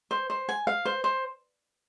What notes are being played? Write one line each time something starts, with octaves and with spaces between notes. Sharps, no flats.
C5
C5
G#5
F5
C5
C5